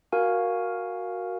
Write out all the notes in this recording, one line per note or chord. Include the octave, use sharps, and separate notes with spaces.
F#4 A#4 F5 G#5